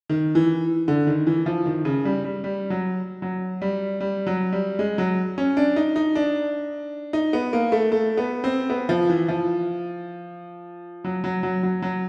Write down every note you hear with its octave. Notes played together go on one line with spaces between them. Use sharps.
D#3
E3
D3
D#3
E3
F3
D#3
C#3
G3
G3
G3
F#3
F#3
G3
G3
F#3
G3
G#3
F#3
C#4
D4
D#4
D#4
D4
D#4
B3
A#3
A3
A3
B3
C4
B3
F3
E3
F3
F#3
F#3
F#3
F#3
F#3